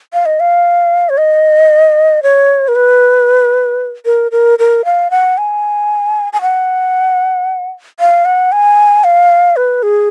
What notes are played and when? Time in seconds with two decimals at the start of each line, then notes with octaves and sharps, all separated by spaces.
0.13 F5
0.26 D#5
0.40 F5
1.09 C#5
1.18 D#5
2.23 C#5
2.68 A#4
2.76 B4
4.06 A#4
4.32 A#4
4.59 A#4
4.85 F5
5.11 F#5
5.38 G#5
6.33 G#5
6.42 F#5
8.00 F5
8.25 F#5
8.52 G#5
9.04 F5
9.56 B4
9.83 G#4